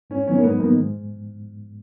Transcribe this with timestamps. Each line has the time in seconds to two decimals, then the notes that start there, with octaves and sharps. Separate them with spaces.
0.10 G#2 C#4
0.26 D#3 F#3 B3 C#4 D#4
0.38 A#3
0.43 G#2 B3
0.59 D#3 F#3 A#3 B3 D#4
0.77 G#2